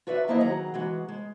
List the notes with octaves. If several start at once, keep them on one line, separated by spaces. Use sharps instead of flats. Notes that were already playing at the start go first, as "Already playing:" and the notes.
F4 F#4 B4 D5 E5
D#3 F3 A#3 E4 C5 D#5
D#3 F#3 G#4 F#5 A#5
E3 G#3 F#4
G#3